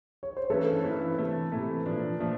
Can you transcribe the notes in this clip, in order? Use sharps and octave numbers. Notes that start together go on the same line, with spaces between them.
C#5
C5
G2 E3 A3 C#4 E4 A4 B4
G2 E3 A3 C#4 E4
C3 E3 A3
C3 E3 A3
A#2 F3 A3 D4
A#2 F3 A3 D4